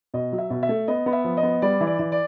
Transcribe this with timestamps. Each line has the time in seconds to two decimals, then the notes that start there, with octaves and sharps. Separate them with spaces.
0.14 B2 D#5
0.32 F#3
0.38 E5
0.50 B2
0.63 E5
0.69 A3
0.88 B3 D#5
1.06 B3
1.13 E5
1.24 F3
1.37 D#5
1.43 B3
1.62 G3 D5
1.81 E3
1.87 D5
1.99 E3
2.12 D5